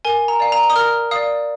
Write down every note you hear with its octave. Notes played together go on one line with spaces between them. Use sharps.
A#4 G#5
A#5
D5 F5
A#5
D#6
A#4 F6
D5 F5 D#6